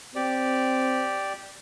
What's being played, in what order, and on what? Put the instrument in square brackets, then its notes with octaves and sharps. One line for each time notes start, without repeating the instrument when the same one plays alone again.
[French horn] C4 [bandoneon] G4 D5